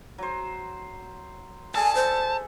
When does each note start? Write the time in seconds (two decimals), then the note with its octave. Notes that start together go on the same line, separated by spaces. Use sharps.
0.18 F#3 C5
1.75 G#4 A4 D5 G#5 A5
1.95 C5 E5